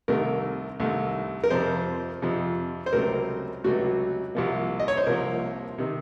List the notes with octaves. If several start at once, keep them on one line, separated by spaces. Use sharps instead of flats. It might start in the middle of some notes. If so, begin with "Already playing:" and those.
C2 C3 D#3 A3 A#4
C2 C3 D#3 A3
A#4
F2 C3 F3 C5
F2 C3 F3
C5
C#2 C3 F#3 A3 A#4
C#2 C3 F#3 A3 F#4
C2 C3 F3 A#3
D#5
C#5
C5
C2 C3 F3 A#3 A#4
C3 D#3